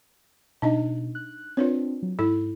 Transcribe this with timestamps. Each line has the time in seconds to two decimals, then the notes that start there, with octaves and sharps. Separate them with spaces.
0.62 B2 D4 D#4 D#5
1.15 F#6
1.57 C4 D4 F4 B4 C#5
2.03 F#3
2.19 G#2 E4 A4